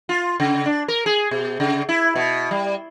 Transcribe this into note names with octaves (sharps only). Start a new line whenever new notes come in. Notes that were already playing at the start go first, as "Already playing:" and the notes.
F4
C#3
D4
A#4
G#4
B2
C#3
E4
B2
G3